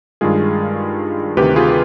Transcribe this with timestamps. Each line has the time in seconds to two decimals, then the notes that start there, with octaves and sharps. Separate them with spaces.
0.21 G2 D#3 G#3 F4 G#4
1.37 D2 C3 D#3 G4 B4
1.56 F4 G#4